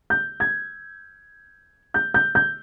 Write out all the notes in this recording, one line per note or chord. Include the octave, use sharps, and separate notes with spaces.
G6
G#6
G6
G6
G6